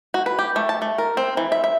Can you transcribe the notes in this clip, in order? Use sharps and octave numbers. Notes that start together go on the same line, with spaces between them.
F#4
B4
G4
A3
A5
A3
A#4
C4
E3
E5
E5